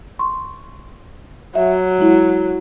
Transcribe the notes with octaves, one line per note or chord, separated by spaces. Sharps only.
C6 C#6
F#3 E5
G#3 E4